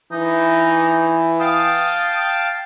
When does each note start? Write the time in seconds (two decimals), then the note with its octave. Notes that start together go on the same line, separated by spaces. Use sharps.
0.12 E3 D#4
1.40 F5 G5 A5 D#6